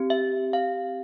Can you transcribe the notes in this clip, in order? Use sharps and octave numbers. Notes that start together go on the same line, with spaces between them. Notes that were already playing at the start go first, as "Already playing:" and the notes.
Already playing: C4 G4
E5
F5